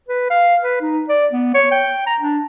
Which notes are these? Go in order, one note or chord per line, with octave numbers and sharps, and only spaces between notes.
B4
F5
B4
D#4
D5
B3
C#5
G5
A#5
D4